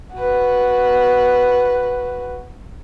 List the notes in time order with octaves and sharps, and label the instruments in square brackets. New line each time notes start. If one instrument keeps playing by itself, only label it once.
[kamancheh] F#4 B4